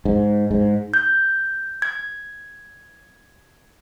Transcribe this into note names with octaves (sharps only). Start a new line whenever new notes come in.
G#2
G#2
G6
G#6